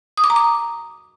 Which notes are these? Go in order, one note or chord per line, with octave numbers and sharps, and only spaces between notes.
D#6
D6
A#5
D6